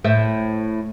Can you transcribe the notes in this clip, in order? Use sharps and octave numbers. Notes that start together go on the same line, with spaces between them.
A2 C5 E5